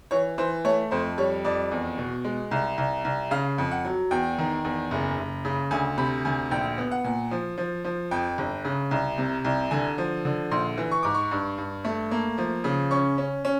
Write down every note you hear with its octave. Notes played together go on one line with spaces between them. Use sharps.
E3 C#5
E3 C5
A3 C#5
F2 C5
G3 C#5
F2 D5
E2
B2
G#3
C2
C2
C2
C#3 F5
F2
F#5
F#3
E2 G5
D#3
E2
F#1
F#1
C#3
D2 G#5
C3 B5
D2 G#5
A#1 G5
B3
F#5
A#2
F3
F3
F3
F2 G5
G1
C#3
C2
C3
C2
D3 G#5
F3
D3
A#1 C6
E3
C#6
G#2 D6
C#6
G2
G2
A3
A#3
F3
C#3
C#4 C#6
C#4
C#4